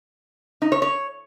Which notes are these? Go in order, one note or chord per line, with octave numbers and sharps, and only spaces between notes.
D#4
C#5
C#5